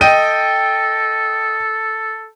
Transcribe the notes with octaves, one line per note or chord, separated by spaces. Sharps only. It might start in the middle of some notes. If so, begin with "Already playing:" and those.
A4 D#5 G5 D#7